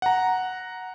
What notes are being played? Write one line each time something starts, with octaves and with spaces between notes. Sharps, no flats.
F#5 A#5